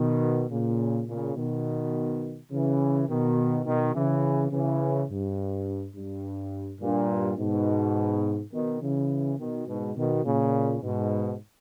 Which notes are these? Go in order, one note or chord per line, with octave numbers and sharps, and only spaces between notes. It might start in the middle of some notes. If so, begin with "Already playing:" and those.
Already playing: B2 D#3
A#2 C#3
A#2 C#3
B2 D#3
C#3 E3
B2 D#3
B2 D#3
C#3 E3
C#3 E3
G2
G2
G2 A#2
G#2 B2
B2 D#3
C#3 E3
B2 D#3
G#2 B2
B2 D#3
A#2 C#3
G#2 B2